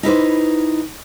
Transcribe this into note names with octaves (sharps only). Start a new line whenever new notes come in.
D#4 E4 B4 C5